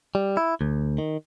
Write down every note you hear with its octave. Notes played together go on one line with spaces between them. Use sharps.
G3
E4
D2
D#3